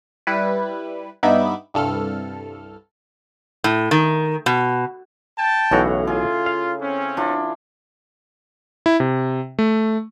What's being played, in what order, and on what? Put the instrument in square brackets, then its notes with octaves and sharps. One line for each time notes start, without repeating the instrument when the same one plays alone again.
[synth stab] G3 E4 B4
G2 B3 D#4 E5 B5 D6
C2 G2 A4 F6
[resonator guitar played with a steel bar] A2
D#3
B2
[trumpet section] G5 A5
[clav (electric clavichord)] B1 E3 F#4 [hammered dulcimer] A2 C#3 A#5
[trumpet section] F4 [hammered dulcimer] G#4
[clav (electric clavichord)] F5
[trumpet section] C4 C#4
[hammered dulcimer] E3 D4 F4
[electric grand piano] E4
C3
A3